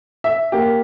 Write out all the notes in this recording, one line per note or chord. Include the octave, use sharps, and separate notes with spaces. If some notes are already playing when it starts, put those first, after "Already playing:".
E5
A#3 G4